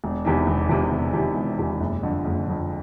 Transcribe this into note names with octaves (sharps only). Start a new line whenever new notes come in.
E1
E2 C3 D#3
E1
E2 C3 D#3
E1
E2 C3 D#3
E1
E2 C3 D#3
F#1
F2 D3
F#1
F2 D3